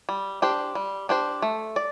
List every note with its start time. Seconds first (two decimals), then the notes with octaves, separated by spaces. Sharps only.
0.09 G3
0.42 D4 G4 C5
0.75 G3
1.09 D4 G4 C5
1.42 A3
1.76 D5